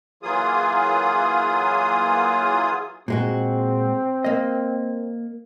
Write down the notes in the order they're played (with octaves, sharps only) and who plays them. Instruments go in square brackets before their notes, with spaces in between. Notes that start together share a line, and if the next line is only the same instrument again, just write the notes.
[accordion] E3 F#3 A#3 F4 G#4 D#6
[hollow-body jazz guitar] A#2 G#3 F#4 [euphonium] C4
[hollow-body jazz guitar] A#3 D#5